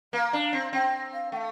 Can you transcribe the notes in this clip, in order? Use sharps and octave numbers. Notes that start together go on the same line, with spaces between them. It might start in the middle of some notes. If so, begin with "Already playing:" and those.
A#3 F5
D4
C4
C4 G5
F5
A3 F5 G5